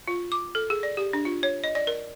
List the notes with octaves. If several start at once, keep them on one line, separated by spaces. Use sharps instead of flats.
F4
D6
A4
G#4
D5
G4
D4
F4
C#5
D#5
D5
A#4